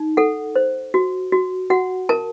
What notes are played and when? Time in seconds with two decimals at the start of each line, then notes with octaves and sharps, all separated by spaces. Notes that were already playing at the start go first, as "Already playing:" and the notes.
Already playing: D#4
0.17 A4 F#5
0.56 C5
0.94 F#4
1.32 F#4
1.70 F#4 F#5
2.09 A#4 A5